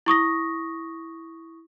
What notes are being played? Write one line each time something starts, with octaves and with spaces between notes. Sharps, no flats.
E4 C#6 D#6 A#6